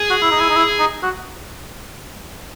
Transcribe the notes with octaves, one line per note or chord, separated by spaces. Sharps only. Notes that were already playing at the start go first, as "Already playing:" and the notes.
Already playing: G#4
F#4
E4
D#4
E4
D#4
E4
D#4
F#4